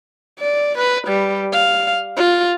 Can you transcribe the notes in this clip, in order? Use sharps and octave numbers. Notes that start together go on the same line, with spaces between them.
D5
B4
G3
F5
F4